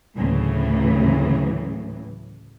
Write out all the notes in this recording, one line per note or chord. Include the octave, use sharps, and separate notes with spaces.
D2 A2 C#3 E3 F#3